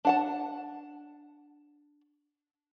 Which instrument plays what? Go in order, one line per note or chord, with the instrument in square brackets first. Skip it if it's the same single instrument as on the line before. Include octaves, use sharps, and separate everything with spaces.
[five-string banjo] D4 F#5 A5